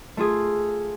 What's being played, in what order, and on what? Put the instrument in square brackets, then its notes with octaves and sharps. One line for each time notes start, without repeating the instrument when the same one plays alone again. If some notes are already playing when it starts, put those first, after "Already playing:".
[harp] A3 F4 G#4